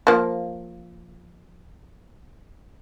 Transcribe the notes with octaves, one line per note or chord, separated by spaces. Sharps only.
F3 A#3